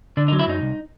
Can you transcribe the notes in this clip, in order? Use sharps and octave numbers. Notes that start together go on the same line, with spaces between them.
D3 D4
D#4
F#3
E4
F#2 D#4
C2